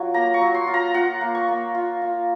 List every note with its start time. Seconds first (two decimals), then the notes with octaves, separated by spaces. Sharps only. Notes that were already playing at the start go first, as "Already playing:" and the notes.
Already playing: F#3 F4 C#6
0.14 A#3 A#5
0.34 C#6
0.41 F#3
0.54 C6
0.67 F4
0.74 A#5
0.94 F4 F#5
1.21 A#3
1.35 C#6
1.48 A#3
1.75 F4
2.02 F4